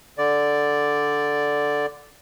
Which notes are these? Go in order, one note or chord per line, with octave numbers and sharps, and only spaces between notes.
D3 D5